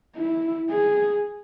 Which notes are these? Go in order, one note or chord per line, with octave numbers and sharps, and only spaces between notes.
E4
G#4